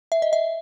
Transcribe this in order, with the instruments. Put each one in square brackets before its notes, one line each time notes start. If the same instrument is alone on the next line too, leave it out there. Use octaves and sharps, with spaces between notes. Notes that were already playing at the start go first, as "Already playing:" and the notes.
[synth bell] E5
D#5
E5